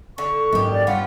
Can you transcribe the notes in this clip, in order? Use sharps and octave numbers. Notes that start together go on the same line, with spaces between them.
D3 C#6
F#1 G#2 D#3 F#3 G4
D5
G2 B3 C#4 F4 F#5